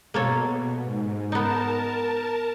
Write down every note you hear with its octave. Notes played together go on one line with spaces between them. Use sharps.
B2 A#3 A4 C#5
G#2
B3 D#4 A#4 A5